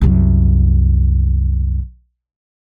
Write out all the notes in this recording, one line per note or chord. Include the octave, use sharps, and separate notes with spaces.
C2 F#2